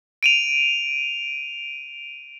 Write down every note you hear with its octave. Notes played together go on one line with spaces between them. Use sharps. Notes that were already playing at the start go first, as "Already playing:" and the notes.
D7 D#7 F7